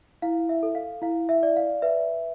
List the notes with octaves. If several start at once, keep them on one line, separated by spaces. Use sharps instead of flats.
E4 F5
E5
A4
F5
E4 F5
E5
D5
F5
B4 E5